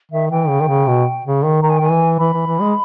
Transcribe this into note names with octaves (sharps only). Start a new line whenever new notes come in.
D#3 E5
E3 G5
C#3
D#3
C#3
B2
C#3
D#3
D#3 A#5
G#5
G5
D#3 G#5
E3
E3 B5
E3
E3
G#3